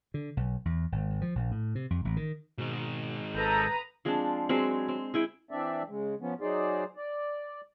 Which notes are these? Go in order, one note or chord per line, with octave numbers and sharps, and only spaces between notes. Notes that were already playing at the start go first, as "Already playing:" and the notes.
D3
B1
E2
G#1
F3
A#1
A2
C3
F2
A1
D#3
G#2 B2 D#3
G#1 A4 B4 A#5 D#6 E6 G6
F3 G#3 C4 D4
F#3 G#3 C4 B5
C4
G#3 E4 G5
E3 C4 D4 D5 E5
C#3 G#3
F3 B3 C#4
F#3 D#4 G#4 C5 D5
D5